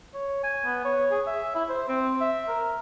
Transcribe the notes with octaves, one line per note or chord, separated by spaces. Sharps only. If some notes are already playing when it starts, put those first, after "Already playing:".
C#5
G#5
B3
C#5
G#4
E5
E4
C5
C4
E5
A#4